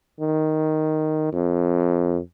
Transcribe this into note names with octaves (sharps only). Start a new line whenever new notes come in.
D#3
F2